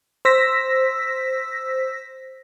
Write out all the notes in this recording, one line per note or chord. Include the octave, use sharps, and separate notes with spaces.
C5 E6 A#6 B6